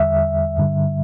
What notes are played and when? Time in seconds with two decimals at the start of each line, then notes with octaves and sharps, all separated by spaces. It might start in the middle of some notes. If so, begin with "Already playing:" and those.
Already playing: E2 D3 G3 E5
0.58 G2 D3 G3